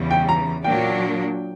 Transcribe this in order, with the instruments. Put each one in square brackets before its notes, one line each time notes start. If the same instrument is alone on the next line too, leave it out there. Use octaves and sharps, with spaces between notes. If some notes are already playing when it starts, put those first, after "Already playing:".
Already playing: [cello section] E2 C#3 E3 G3
[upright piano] G5
A#5
[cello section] A#2 F#3 A#3 D4 [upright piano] G5